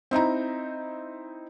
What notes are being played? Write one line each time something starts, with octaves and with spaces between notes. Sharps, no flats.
C4 D#4 E4 A#5